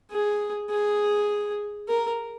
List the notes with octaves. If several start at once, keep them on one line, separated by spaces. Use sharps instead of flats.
G#4
G#4
A#4